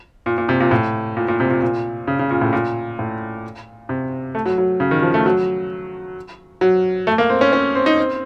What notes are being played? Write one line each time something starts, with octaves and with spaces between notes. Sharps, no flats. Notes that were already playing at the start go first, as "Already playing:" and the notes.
A#2
A#2
C3
A#2
A2
A#2
A#2
C3
A#2
A#2
C#3
C#3
A#2
A2
A#2
A2
C3
A3
F#3
F#3
C#3
D#3
F3
A3
F#3
F#3
A3
A#3
C4
C#4
C#4
C4
D#4
C4